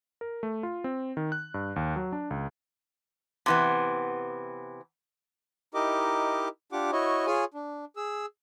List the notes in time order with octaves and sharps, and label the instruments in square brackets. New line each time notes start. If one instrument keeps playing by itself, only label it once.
[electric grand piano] A#4
A3
F4
C4
D#3
F#6
G2
D#2
F#3
D4
C#2
[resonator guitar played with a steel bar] C3 E3 B3
[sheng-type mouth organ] D#4 E4 G4 A#4 D#5 D6
D4 F4 G4 F#5 D6
E4 F#4 C#5 D#5
F4 G#4 C#5 G#5
D4
G#4 E6